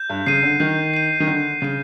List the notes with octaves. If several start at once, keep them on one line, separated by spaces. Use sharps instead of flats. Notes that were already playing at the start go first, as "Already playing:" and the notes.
Already playing: G6
G2
C#3 C7 D#7
D3
D#3 G6
C7 D#7
D#3
D3 G6
C#3 C7 D#7